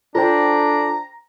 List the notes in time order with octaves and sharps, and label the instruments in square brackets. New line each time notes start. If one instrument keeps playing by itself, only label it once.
[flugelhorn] D4 [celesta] F4 [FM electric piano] A4 C5 G5 [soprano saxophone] A#5